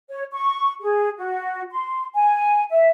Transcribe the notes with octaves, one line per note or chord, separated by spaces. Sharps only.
C#5
C#6
G#4
F#4
C6
G#5
E5